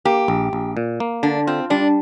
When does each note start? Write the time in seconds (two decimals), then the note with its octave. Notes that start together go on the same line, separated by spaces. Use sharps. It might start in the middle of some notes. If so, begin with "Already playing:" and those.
0.05 A#3 G4
0.28 A#1
0.53 A#1
0.77 A#2
1.00 A#3
1.23 D3 D4
1.47 C4 F4
1.70 G3 D4